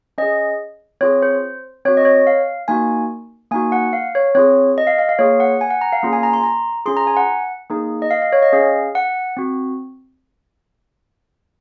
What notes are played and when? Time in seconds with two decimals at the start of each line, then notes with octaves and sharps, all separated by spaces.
0.18 C#4 G#4 D#5
1.01 C4 F4 G#4 C#5
1.22 C5
1.85 C4 C#5
1.88 F#4
1.97 D#5
2.05 C#5
2.27 F5
2.68 A#3 D#4 F#4 G#5
3.51 A#3 D#4 F#4 G#5
3.72 F#5
3.93 F5
4.15 C#5
4.35 C4 F4 G#4 C#5
4.78 D#5
4.87 F5
4.99 F5
5.09 F5
5.19 A#3 F4 G#4 C#5
5.40 F#5
5.61 G#5
5.70 F#5
5.81 A#5
5.93 F5
6.03 A#3 C#4 F4 G#4
6.13 G#5
6.23 A#5
6.33 C6
6.44 A#5
6.86 C#4 F4 G#4 C6
6.97 A#5
7.07 G#5
7.17 F#5
7.70 A#3 D#4 G#4
8.02 D#5
8.11 F5
8.22 F5
8.33 C#5
8.42 D#5
8.53 C#4 G#4 F5
8.95 F#5
9.37 C4 F#4